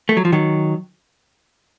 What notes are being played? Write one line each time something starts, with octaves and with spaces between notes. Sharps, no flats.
A3
F#3
F3
D#3 F#3